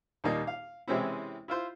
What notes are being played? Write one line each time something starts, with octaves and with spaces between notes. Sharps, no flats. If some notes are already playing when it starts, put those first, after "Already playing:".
D#2 A#2 G3 A#3 D#4
F5
C3 E3 G#3 C4 C#4 E4
E4 F4 C5